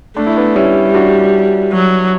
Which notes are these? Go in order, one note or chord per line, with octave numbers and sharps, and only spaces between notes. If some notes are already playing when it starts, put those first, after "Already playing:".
A3 D4
E4
B3 D4
G3 C#4 E4
D4 F#4
F#3